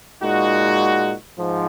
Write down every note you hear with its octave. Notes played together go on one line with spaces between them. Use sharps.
A#2 G#3 D#4 F#4
G#2 F3